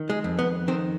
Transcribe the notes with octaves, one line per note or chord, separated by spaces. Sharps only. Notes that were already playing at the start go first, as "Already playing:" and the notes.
Already playing: D#3
G#3
F2
B3
D#3 C4